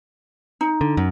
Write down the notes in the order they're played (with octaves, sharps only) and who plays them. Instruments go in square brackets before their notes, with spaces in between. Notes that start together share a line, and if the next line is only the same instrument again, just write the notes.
[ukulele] D#4
[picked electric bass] D3
F#2